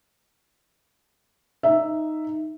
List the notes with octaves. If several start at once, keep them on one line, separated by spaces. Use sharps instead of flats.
D#4 E5